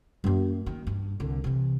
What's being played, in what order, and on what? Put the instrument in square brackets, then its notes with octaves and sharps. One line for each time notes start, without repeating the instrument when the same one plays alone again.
[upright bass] F#2 A#3
D#3
G2
C2 D3
C3 E3